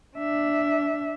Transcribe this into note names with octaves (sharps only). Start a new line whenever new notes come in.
D4 E5